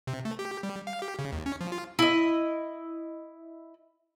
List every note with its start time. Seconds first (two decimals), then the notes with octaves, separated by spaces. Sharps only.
0.07 C3
0.25 A3
0.39 G4
0.63 G3
0.87 F5
1.02 G4
1.19 C#3
1.32 D#2
1.46 C#4
1.61 F3
1.72 F4
1.99 E4 D#5